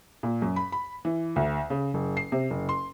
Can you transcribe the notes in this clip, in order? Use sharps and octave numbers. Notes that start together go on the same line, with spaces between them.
A#2
F#2
B5
B5
E3
D2
C#3
F#1
C7
C3
F#1
C6